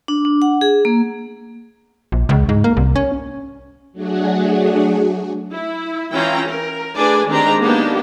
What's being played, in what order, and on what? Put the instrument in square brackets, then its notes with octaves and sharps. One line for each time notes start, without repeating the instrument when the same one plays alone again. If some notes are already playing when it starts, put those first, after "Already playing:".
[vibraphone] D4
D4
F#5
G#4
A#3
[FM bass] A#1
C#2
G#2
A#3
C2
C#4
[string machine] F#3 A3 D4 F#4 G#4
[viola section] E4
E3 C#4 E4 F4 G5 A#5
A#4
A3 D4 G#4 B4 D5 G#5
D#3 G#3 C4 D4 G4 A#5
A#3 B3 D4 D#4 G4